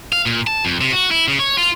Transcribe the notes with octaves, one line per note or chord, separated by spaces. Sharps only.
F5
A#2
A5
F2
C3
F#4
E4
C#3
C#5
F4